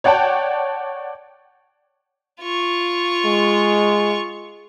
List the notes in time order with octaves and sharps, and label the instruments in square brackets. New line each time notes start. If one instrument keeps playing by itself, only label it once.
[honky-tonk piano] C#5 D5 F#5 G5 A5
[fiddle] F4 C#6
[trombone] G#3